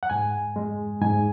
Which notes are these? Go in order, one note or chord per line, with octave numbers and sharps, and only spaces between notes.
F#5
G#2 G#5
G#3
G#2 G#5